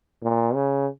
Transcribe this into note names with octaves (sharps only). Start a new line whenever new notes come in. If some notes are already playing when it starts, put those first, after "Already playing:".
A#2
C#3